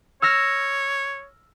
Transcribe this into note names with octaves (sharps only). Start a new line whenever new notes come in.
C#5 E6 F6 A#6